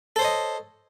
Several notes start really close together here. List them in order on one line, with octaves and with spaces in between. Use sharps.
A4 C5 C#5 D#5